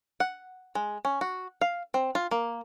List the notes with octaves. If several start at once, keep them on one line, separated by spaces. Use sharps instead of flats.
F#5
G#3
C#4
F#4
F5
C4
F4
A#3